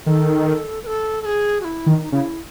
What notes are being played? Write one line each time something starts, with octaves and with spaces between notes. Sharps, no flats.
D#3 A4
B4
A4
A4
G#4
F#4
E4
D#3
D#4
C#3 E4